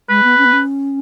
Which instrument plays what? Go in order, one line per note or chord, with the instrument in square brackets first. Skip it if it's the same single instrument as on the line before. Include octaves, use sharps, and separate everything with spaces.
[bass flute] G#3 [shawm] B4
[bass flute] B3
C#4
B3
C#4